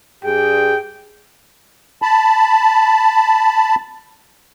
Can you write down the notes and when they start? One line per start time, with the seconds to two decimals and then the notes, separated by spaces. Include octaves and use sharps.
0.24 G2 G4 G#4 G5
2.02 A5 B5